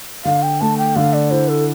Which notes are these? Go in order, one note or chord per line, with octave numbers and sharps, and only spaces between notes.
D3 F5
G5
A3 A5
G5
D3 F5
D5
E4 C5
A4